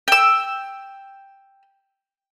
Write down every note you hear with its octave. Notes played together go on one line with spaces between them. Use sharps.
G5 E6